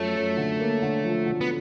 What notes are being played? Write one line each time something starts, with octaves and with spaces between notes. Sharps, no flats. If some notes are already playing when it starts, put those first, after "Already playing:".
Already playing: F#2 F3 A3
F#2
D3
A#3
D3
F3
D3
B3